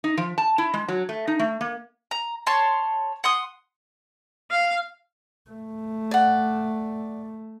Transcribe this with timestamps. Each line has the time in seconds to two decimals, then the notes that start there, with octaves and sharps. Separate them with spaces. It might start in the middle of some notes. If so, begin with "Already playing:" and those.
0.04 D#4
0.17 F3
0.38 A5
0.58 E4
0.74 G#3
0.88 F#3
1.09 A3
1.28 D#4
1.39 A3
1.61 A#3
2.11 A#5
2.47 C#5 A5 C6
3.24 F#5 C6 D#6
4.51 F5
5.51 A3
6.11 D5 F#5